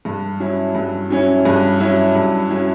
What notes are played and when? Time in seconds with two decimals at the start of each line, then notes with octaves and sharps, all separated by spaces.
0.05 G2
0.40 F#3 C#4 E4
0.75 G2
1.10 F#3 C#4 E4
1.45 G2
1.80 F#3 C#4 E4
2.15 G2
2.50 F#3 C#4 E4